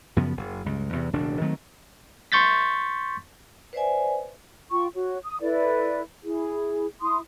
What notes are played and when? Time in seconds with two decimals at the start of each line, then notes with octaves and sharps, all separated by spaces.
0.16 F#2 C#3 F3 B3
0.37 F#1
0.65 C#2 G2
0.93 E2 C3
1.13 E1 A1 C#3 D4
1.41 D#3 F#3 A3 C4
2.32 C6 C#6 G6 A6 B6
3.73 B4 C5 D5 E5 G#5
4.71 F4 G5 C#6
4.94 F#4 C#5
5.24 D#6
5.40 E4 A4 B4 D5
6.24 E4 G#4
7.01 E4 C6 D#6